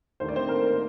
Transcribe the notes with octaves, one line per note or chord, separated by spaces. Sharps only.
D#2 D#3 A3 D4 C5
D5
C4 C5
A#3 A#4
C5